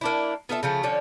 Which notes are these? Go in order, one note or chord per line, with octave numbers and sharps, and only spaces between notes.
A#3 D4 E4
B3 F4 A4 E5
C#3 F3 A3
D3 F3 C#4 D5